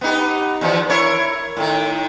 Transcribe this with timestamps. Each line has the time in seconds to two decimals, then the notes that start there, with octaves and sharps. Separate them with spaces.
0.01 B3 D#4 G4
0.61 E2 D#3 F3
0.90 E4 A#4 C#5
1.57 A2 D#3